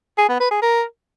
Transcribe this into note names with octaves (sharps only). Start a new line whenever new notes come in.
G#4
B3
B4
G#4
A#4